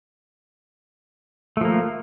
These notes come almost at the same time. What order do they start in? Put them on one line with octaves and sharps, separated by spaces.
A3 F3 A#3